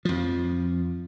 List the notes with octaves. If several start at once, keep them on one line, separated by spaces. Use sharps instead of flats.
F2 F3